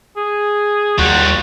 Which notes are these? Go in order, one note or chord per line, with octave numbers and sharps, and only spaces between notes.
G#4
D#2 G3 F4 F#4